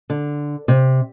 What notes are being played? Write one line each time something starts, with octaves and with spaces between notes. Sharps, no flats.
D3
C3